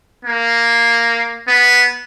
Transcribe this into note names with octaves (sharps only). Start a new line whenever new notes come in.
A#3
B3